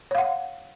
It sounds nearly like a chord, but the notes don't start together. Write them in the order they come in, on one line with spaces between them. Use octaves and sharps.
C#5 F5 F#5